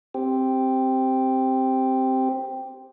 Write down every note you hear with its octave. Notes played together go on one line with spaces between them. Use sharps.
C4 G4